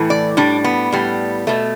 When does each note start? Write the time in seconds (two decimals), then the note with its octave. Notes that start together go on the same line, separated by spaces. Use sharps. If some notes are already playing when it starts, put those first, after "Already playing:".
Already playing: A2 E3 A3
0.10 D5
0.37 A2 G3 D4
0.64 B3
0.92 A2 G3
1.47 B2 A3